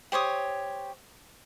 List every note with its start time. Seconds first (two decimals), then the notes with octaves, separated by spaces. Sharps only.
0.12 G4 C5 C#5 D#6